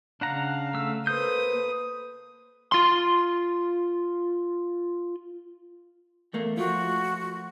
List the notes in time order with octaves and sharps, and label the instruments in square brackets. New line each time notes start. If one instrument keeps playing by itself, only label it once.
[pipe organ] C#3 F5 [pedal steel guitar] D4 F#5 A#5
[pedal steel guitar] A3 E6
[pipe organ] A#3 C5 [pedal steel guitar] A4 G6 [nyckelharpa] B4 D#6
[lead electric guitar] F4 C6
[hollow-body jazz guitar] E2 A3 A#3
[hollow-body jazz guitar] F3 A3 F4 [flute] F#4